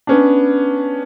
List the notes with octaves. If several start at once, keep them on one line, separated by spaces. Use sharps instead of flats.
B3 C#4 D4